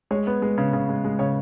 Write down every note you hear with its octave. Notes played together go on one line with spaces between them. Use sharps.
G#3 C#5
B3
G#3
C#3
C#3
G#3
G#3
C#3 C#5